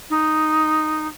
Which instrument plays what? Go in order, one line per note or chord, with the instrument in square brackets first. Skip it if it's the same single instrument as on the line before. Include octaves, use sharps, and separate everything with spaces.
[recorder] D#4